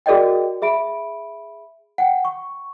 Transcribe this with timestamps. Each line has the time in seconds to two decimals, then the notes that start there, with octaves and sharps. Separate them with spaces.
0.06 F#4 G#4 A#4 D5 D#5 G5
0.62 G#4 E5 B5 D7
1.98 F#5 G5
2.25 C#6